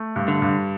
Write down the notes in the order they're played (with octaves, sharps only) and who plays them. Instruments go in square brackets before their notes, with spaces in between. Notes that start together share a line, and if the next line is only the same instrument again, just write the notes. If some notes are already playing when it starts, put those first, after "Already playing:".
Already playing: [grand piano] A3
G2
[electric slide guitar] D3
[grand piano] G2